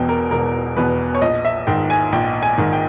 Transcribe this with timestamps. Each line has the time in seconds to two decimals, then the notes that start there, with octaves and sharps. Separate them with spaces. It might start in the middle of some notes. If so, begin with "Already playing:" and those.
Already playing: E1 E2 B2 G5
0.09 A#4
0.31 E1 A#4
0.77 E2 B2 B4
1.15 C#5
1.21 A#1 D#5
1.45 E5
1.67 G#2 D#3 G5
1.90 G#5
2.12 A#1 G5
2.43 G#5
2.58 G#2 D#3
2.73 G5